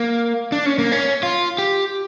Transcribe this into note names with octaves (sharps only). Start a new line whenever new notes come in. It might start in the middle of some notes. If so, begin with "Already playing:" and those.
Already playing: A#3
D4
C#4
A#3
C#4
F4
G4